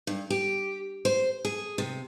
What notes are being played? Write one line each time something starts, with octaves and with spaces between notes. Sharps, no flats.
G2
G4
C5
G#4
C3